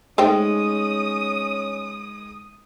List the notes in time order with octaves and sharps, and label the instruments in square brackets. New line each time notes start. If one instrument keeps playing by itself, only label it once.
[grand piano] G#3 D#4 [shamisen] A3 C5 G5 [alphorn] C#4 [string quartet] D#6